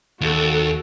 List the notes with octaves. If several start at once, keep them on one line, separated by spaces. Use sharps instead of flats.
D#2 F#4 A4